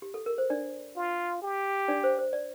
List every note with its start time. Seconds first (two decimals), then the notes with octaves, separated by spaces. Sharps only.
0.02 G4
0.14 A4
0.26 A#4
0.38 C5
0.50 D4 D5
0.96 F4
1.42 G4
1.88 D4 D5
2.04 C5
2.19 C5
2.33 D5